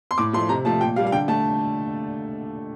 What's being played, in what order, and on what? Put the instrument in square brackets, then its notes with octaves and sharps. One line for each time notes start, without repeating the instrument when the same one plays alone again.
[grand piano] C6
A2 D6
F3 A3 C6
C3 A#5
F3 A3 A5
A#2 G5
G3 A#3 F5
F5
D3 G5
A3 A5